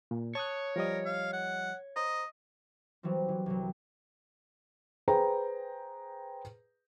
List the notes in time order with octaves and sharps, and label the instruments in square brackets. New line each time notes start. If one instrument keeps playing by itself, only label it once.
[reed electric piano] A#2
[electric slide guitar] C#5 [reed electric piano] A5 D#6 F#6
[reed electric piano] F3 G3 D#5 [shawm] A#4
[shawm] F5
F#5
[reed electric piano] C5 A#5 [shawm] D#5
[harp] E3 F#3 G3 C4
E3
C2 F#3
[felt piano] G#4 B4 C5 G5 A#5